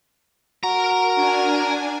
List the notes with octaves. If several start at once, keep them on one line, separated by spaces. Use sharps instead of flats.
F#4 A#4 A#5
D4 G#5